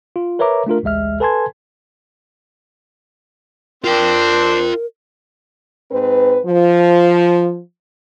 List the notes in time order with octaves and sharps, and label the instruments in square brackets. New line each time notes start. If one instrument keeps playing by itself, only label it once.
[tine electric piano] F4
A#4 B4 C#5 E5 A#5 D6
A3 D4 F4 A#4
A1 D2 G#3 E5 F6
A4 B4 G#5 A5 C6 G#6
[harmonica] C4 D4 C5 [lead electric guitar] F4 G5 [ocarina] A#4
[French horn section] G#2 C4 B4
F3